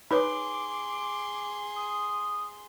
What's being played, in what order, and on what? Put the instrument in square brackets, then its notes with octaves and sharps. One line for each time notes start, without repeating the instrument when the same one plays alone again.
[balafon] D#4 B4 C#5 [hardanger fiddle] G#4 C6 [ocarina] D6
[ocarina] D#6